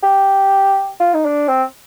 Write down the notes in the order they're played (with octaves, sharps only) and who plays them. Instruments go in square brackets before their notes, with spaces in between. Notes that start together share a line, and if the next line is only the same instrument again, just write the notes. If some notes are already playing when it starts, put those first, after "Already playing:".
[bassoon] G4
F4
D#4
D4
C4